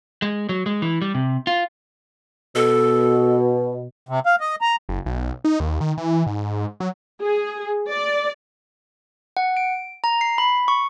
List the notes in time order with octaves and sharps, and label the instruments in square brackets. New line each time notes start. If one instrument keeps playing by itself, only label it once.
[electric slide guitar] G#3
F#3
G#3
E3
G3
C3
F4
[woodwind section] B2 [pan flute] A4
[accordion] C3
F5
D#5
A#5
[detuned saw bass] F#1
B1
D#4
D#2
D#3
E3
G#2
F#3
[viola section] G#4
D5
[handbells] F#5
D7
A#5
C7
B5
C#6